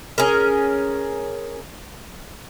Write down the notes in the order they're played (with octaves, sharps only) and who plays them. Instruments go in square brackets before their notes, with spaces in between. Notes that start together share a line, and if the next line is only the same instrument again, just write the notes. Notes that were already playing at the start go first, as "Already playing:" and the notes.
[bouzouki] C#4 G#4 A#4